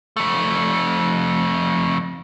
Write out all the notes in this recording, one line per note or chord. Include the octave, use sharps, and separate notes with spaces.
F2 A3